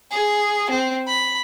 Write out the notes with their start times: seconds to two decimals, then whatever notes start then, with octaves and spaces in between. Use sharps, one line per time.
0.11 G#4
0.70 C4
1.07 B5